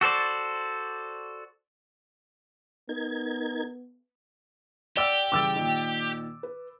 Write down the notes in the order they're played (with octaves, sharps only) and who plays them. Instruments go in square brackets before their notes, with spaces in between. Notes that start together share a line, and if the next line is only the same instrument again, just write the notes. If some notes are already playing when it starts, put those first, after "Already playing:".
[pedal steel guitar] F#4 A4 C5 D5
[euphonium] B3 [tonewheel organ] D#4 A#4 G#6
[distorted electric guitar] G4 [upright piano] D5 D6 E6 [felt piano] F#5
[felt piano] C#3 E3 G3 [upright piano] D6 E6 A6
[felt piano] A#2 D#3
B4